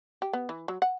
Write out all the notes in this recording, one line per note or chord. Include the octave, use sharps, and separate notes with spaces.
G4
B3
E3
F#3
F#5